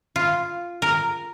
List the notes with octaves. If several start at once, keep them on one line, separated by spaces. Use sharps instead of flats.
F4
A#4